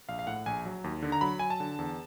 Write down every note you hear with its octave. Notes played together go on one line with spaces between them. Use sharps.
A#1 F5
F5
A2 F#5
A#1 G#5
F#3
D#2
D3
A#5
F#3 B5
F#3 G#5
A5
D3
E2